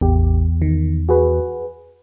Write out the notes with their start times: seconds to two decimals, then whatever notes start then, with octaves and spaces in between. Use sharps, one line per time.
0.01 A1 E2 G4
0.62 D#3
1.09 F#4 G#4 B4